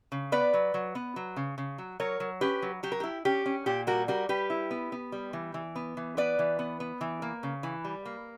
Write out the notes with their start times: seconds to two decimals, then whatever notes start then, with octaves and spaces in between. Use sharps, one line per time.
0.12 C#3
0.32 B3 B4 D5
0.54 F#3
0.74 F#3
0.95 B3
1.16 F#3
1.36 C#3
1.58 C#3
1.78 F#3
2.00 F#3 A#4 C#5
2.20 F#3
2.41 C#4 G4 B4
2.62 F#3
2.83 F#3 G4
2.92 A#4
3.00 E4 G4
3.25 C#4 G4
3.46 C#4
3.66 A#2 G4
3.87 G3 F#4 A#4
4.08 G3 F#4 A#4
4.29 G3 G4 B4
4.50 E4
4.71 B3
4.92 B3
5.12 G3
5.33 E3
5.54 E3
5.76 B3
5.97 E3
6.17 B3 B4 D5
6.39 E3
6.59 B3
6.80 B3
7.01 E3
7.22 A#3
7.43 C#3
7.63 E3
7.85 G3
8.05 A#3